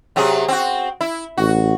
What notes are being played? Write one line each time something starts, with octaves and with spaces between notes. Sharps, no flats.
C3 F#3 G#4
C4 F#4
E4
A1 F#4